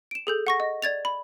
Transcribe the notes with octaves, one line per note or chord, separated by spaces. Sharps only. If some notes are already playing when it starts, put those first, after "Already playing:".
D7 E7
G#4 A4 G6
F#5 C#6 A#6
D#5
D5 G#6 A6 F7
B5